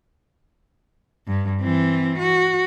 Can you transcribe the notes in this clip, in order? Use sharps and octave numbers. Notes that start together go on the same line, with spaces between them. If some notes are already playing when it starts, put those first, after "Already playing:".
G2
E3 C4
F#4